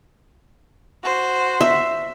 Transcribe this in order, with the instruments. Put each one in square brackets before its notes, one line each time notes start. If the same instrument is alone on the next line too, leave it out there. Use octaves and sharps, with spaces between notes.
[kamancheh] F#4 C5
[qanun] E5